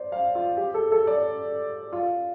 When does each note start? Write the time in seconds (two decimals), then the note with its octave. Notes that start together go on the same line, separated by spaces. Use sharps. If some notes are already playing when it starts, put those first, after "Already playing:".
Already playing: C5 D5
0.12 F5
0.35 F4
0.57 G4
0.74 A4
0.92 A4
1.07 D5
1.93 F4